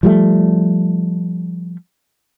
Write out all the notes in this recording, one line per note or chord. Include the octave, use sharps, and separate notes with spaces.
F3 G3 A3